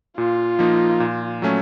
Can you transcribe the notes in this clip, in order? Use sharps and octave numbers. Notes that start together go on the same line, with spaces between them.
A#2 F4
F3 A#3 D#4
A#2
F#3 A3 C#4